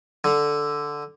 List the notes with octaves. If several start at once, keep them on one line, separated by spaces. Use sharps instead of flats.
D3